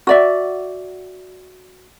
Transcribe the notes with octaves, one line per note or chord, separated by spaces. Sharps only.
F#4 D5 E5